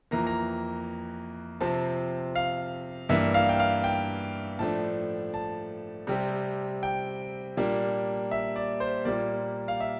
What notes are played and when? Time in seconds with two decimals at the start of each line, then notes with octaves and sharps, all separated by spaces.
0.11 F2 E3 A#3 A#5
0.27 A#5
1.61 C3 F3 C4 A5
2.35 F5
3.09 G2 E3 A#3 D4 E5
3.34 F5
3.49 G5
3.59 F5
3.84 G5
4.59 A2 F3 A3 D4 A5
5.34 A5
6.07 C3 G3 C4
6.83 G5
7.57 A#2 G3 A#3 D4
8.31 E5
8.56 D5
8.80 C5
9.05 A#2 G3 A#3 D5
9.68 F5
9.80 E5